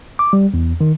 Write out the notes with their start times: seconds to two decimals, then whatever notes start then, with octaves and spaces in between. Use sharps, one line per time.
0.19 D6
0.33 G3
0.54 E2
0.81 D#3